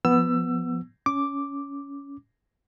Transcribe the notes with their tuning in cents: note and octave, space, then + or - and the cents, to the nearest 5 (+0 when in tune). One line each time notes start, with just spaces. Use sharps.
F3 +0 B3 +0 E6 +20
C#4 +15 D6 +0